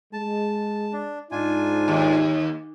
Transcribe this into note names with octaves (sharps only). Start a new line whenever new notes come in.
G#3 A5
D4
G#2 D4 D#4 F4 G#5
D#2